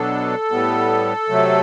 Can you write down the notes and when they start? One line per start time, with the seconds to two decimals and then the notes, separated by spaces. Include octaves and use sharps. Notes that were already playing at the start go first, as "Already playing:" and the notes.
Already playing: B2 F#3 B3 D4 A4
0.51 A2 G3 B3
1.29 C3 F#3 A3